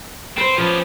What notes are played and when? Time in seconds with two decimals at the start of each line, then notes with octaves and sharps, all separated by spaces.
0.38 C4 B4 C5
0.58 F3 B3 C#4 G4